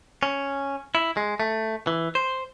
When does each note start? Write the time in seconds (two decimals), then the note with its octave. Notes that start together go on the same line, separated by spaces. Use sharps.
0.23 C#4
0.95 E4
1.17 G#3
1.40 A3
1.87 E3
2.15 C5